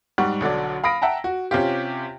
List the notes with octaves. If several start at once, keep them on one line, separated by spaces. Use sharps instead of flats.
G#2 G3 F#5 C#6
B1 D3 F#3 D5
F5 B5 D#6 A#6 D7
E5 F#5 G5 A5 A#5
F#4
C3 C#4 F4 G4